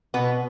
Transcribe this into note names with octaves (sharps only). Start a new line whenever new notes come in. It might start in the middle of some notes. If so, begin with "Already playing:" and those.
B2 B3 B4